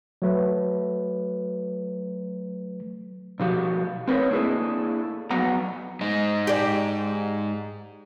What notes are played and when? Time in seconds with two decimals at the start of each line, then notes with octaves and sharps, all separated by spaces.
0.22 F#3 A3 B4
3.40 B2 F3 F#4 G4
4.08 C4 A#4 B4 C#5
4.31 A#3 D4 E4 G#4 A4
5.31 F2 F#3 B3 F#5 A#5
6.01 G#2 G#3 D#5
6.47 G4 D5